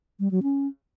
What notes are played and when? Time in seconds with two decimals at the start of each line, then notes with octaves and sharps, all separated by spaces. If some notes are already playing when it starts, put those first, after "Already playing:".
0.20 G3
0.31 F#3
0.43 C#4